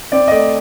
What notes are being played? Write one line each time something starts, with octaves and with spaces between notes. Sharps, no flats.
C4 D5
D#5
A3 D5